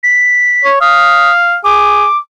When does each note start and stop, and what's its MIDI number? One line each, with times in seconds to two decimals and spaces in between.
0.03 0.69 95
0.64 0.78 73
0.81 1.56 77
0.81 1.31 87
1.64 2.06 68
1.64 2.18 86